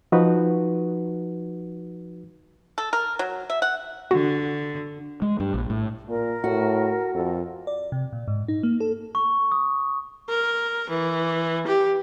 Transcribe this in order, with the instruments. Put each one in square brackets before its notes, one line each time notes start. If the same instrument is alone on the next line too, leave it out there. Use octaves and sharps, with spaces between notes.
[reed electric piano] F3 D#4 F#4 B4
[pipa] A4
A#4
F#3
E5
F#5
[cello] D3 [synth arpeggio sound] F#4
[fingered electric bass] G#3
G2
A#1
A2
[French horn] A#2 [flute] A#4
[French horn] A2 [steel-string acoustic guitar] F#4
[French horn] F2 [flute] A4
[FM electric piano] D5
C3
A#2
G#2
D#4
A#3
A4
[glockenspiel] C#6
D#6
[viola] A#4
E3
G4